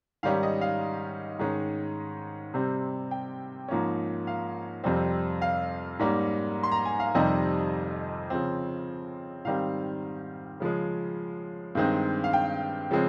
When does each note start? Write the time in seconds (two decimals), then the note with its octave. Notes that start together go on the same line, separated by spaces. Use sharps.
0.23 G#2 D#3 G3 C#4 F5
0.43 D#5
0.61 F5
1.39 G#2 D#3 G#3 C#4
2.54 C3 G3 C4
3.11 G5
3.68 G#2 F3 A#3 C#4
4.27 F5
4.84 F2 C3 G3 C4
5.42 F5
5.99 G#2 G3 A#3 C#4
6.63 C6
6.72 A#5
6.85 G#5
7.00 F5
7.15 F2 C3 D#3 G3 C4 D#5
8.30 C#3 F3 C4
9.45 G#2 D#3 G3 C4 F5
10.60 C#3 F3 G#3
11.75 G2 D#3 G#3 C4
12.24 F5
12.33 G5
12.91 C#3 F3 G#3 C4